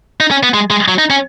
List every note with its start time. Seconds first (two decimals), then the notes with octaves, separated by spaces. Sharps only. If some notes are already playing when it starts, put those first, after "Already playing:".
0.20 D#4
0.31 C#4
0.43 B3
0.54 G#3
0.70 G#3
0.88 F#3
0.99 D#4
1.10 C#4